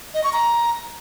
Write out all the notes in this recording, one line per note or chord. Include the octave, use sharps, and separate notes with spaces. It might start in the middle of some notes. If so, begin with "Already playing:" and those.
D#5
C#6
A#5